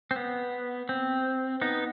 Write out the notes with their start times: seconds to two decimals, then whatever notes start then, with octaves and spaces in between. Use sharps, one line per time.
0.11 C4
0.16 B3
0.89 C4
1.61 B3 D#4